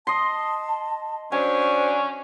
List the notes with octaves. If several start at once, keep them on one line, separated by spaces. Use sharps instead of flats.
D#5 A5 C6
F#3 C#4 D4 C5 G#5